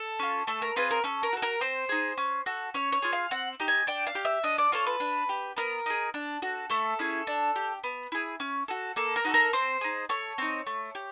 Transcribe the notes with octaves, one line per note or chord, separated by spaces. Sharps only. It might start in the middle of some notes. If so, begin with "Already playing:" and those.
Already playing: A4
C#4 F4
A3 A4
A#4
C4 F4 G#4 B4
A#4
C#4 A4
A#4
F#4 A4
A#4
C4 C5
D#4 G#4
C#4
F#4 A4
C#4 C#5
C#5
F4 G#4
F5
C4 F#5
D#4 G4
G#5
D4 G5
F5
G4
E5
D4 D#5
D5
F4 A4 C#5
B4
D4
G4
B3 A#4
D#4 G#4
D4
F#4 A4
A3 A4
C#4 E4 G#4
D4
G4
B3
E4 G#4
C#4
F#4 A4
A#3 A4
A#4
D#4 F#4 A4
A#4
C4 C5
D#4 G#4
A3 C#5
C4 D#4
A3
G4